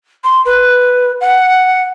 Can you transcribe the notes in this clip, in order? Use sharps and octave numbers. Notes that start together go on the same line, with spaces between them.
C6
B4
F#5